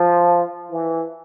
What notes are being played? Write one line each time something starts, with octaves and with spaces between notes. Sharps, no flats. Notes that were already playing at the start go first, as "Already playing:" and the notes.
Already playing: F3
E3